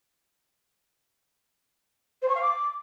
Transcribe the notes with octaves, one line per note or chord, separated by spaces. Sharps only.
C5
C#6
F5
D6